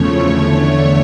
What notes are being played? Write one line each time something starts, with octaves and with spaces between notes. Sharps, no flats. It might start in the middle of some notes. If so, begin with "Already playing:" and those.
Already playing: E2 C#3 F3 A3 C#5
E2 D3 A3